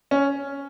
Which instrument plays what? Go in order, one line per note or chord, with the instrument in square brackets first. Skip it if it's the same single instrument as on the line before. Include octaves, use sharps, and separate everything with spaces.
[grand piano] C#4